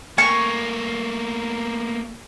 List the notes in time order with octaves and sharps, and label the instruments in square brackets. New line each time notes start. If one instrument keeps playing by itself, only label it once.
[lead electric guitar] A3 A#3 [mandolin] G#5 C#6